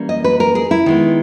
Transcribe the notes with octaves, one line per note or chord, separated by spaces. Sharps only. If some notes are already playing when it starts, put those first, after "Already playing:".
Already playing: E3 G3 A#3 C#4
D#5
B4
A#4
G#4
E4
D#3 G#3 B3